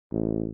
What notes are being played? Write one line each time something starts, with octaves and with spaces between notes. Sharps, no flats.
A1